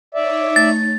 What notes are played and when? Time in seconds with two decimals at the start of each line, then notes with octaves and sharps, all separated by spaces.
0.15 D#4 C#5 D5 E5
0.56 A3 A6